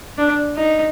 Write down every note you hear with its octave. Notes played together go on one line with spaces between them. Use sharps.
D4
D#4